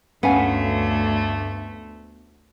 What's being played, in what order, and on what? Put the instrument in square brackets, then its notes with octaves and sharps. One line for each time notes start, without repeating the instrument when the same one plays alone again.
[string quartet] D2 A3 [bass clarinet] G2 [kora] B3 [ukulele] C#4 F5 G#5